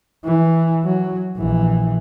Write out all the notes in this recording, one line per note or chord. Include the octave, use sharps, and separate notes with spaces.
E3
F#3
A#1 E3